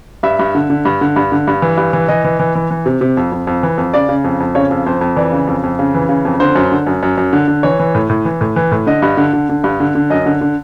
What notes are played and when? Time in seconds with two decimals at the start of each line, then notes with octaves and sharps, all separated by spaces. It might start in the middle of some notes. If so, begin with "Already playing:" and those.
0.23 G2 E5
0.39 G2
0.55 D3
0.70 D3
0.85 G2
1.01 D3
1.16 G2
1.32 D3
1.47 G2
1.62 E3
1.77 G2
1.93 E3
2.08 E3 D#5
2.24 E3
2.39 E3
2.55 E3
2.71 E3
2.86 C3
3.01 C3
3.17 F2
3.32 F2
3.47 F2
3.63 E3
3.78 F2
3.94 C#3 D5
4.09 C#3
4.24 F2
4.40 F2
4.55 C#3 C#5
4.71 F2
4.86 F2 C5
5.01 F2
5.16 E3 D5
5.32 C#3
5.47 F2
5.63 F2
5.79 C#3
5.94 E3
6.09 C#3
6.25 F2
6.40 D3 C5
6.55 F#2
6.72 D3
6.87 F#2
7.03 F#2
7.17 F#2
7.33 D3
7.48 D3
7.63 E3 C#5
7.79 E3
7.95 A2
8.09 A2
8.25 E3
8.41 A2
8.56 E3
8.71 A2
8.87 D3 D#5
9.02 G2
9.17 D3
9.33 D3
9.49 D3
9.64 G2
9.80 D3
9.95 D3
10.10 F#2 D#5
10.26 D3
10.41 D3